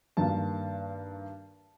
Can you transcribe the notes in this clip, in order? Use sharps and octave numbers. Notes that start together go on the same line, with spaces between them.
G2 D#3 G3 A#3 A5